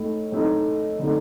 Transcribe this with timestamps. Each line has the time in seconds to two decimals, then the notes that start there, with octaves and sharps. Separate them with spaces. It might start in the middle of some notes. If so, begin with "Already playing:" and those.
Already playing: A2 A3 D#4
0.32 A2 A3 D#4
0.99 D3 A3 D#4